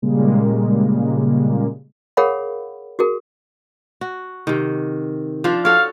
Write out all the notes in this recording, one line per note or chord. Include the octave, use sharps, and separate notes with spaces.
A#2 C#3 G3 G#3 A#3
G#4 A#4 C#5 F5 F#5 B5
F#4 G#4 A#4
F#4
C3 D#3
F3 D4 F4
F#4 A4 C#5 F5